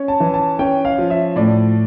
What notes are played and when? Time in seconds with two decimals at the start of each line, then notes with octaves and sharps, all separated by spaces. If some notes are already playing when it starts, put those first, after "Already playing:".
Already playing: C#4
0.08 A5
0.20 E3
0.34 A5
0.59 C#4 G5
0.85 F5
0.98 F3
1.10 E5
1.36 A2 D5